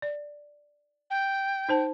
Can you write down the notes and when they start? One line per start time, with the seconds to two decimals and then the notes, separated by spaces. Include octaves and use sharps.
0.02 D5
1.10 G5
1.68 D#4 C5 A5